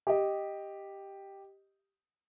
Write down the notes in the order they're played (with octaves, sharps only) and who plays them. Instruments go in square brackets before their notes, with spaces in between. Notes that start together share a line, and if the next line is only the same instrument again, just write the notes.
[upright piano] G4 D#5